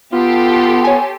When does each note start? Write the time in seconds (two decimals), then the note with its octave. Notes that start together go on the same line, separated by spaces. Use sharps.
0.13 B3 F4 G4 A4 C6
0.84 C#5 G#5